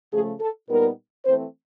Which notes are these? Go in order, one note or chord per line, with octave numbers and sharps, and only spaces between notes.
C#3 F3 A3 G#4
A4
A#2 G3 B3 D#4 A#4
E3 A3 C4 C5